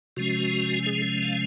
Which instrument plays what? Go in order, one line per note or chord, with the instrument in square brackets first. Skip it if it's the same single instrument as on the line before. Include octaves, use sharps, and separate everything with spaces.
[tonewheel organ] C3 F3 G#3 C#4 F#4
G#4
F5